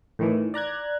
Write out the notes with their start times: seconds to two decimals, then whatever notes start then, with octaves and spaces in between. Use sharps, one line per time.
0.19 A2 D#3 E3
0.54 D5 A#5 F#6 G#6